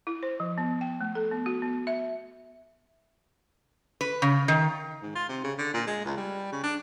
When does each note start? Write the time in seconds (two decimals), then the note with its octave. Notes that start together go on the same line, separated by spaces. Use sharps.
0.07 E4
0.23 C5
0.40 F3
0.58 B3
0.81 G5
1.01 A3
1.15 A4
1.31 B3
1.46 F#4
1.62 B3
1.87 E5
4.01 B4
4.22 C#3
4.48 D#3
5.02 G#2
5.15 F4
5.29 C3
5.44 C#3
5.59 D3
5.74 A#2
5.87 G#3
6.05 C#2
6.17 G3
6.52 C#3
6.63 D4